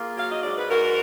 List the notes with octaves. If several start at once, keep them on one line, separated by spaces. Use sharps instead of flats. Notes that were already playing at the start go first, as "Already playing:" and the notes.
Already playing: A#3 F4 G#4
F#3 F5
D#5
G#2 D5
B4
G#2 F#4 A#4